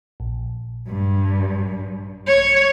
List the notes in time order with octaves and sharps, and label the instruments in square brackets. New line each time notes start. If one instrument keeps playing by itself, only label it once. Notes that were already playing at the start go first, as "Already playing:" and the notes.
[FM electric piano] A#1
[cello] G2
C#5